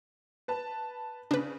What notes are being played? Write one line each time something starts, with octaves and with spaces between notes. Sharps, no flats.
B4 A5
C#3 D4 B4